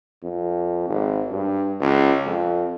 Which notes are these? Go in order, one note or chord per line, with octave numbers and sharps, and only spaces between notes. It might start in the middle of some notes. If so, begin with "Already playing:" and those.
F2
G#1
G2
C#2
F2